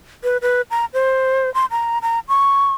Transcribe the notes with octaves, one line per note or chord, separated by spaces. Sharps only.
B4
B4
A#5
C5
C6
A#5
A#5
C#6